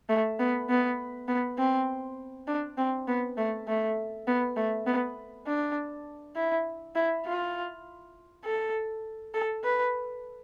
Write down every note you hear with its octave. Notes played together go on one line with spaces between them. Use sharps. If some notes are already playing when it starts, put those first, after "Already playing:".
A3
B3
B3
B3
C4
D4
C4
B3
A3
A3
B3
A3
B3
D4
E4
E4
F4
A4
A4
B4